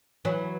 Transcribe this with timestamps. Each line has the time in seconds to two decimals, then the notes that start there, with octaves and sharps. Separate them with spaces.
0.25 E3 F#3